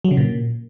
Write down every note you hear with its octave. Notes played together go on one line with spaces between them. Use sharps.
F#3
C#3
A#2